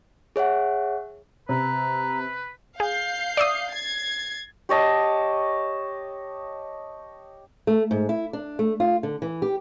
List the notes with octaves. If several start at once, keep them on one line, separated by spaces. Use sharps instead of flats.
G#4 C#5 E5 F#5
C3 B4 A#5
G#4 F5 G6 C7
D5 E5 D#6
G#6 A6 C7
G4 C#5 D#5 A5
A3
G#2
E4
D4
A3
F4
D3
E3
G4